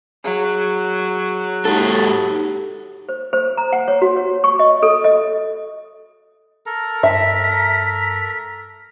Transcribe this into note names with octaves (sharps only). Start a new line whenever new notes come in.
F#3 G#4
G#2 D#4 G4 A4 F#5
C5
C5
A#5
F#5
C#5
F#4
C#5
C#6
D#5
A4
D#5
A4 A#4 A#5
G2 E5 A5 B6